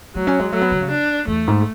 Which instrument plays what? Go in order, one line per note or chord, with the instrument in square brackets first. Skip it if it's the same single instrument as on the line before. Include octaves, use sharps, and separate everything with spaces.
[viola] F#3 [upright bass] A3
[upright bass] C#4
G#3
[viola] F#3 [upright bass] A3
[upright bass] B3
D3
C#3
[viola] D4
[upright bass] E2 [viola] A3
[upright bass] G#2